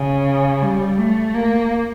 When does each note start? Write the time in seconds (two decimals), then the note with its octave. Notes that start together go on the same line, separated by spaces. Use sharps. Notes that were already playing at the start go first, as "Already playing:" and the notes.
Already playing: C#3
0.61 G3
0.98 A3
1.35 A#3